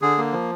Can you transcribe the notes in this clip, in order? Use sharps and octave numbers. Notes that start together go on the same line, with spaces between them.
D3 G#4
A#3
F3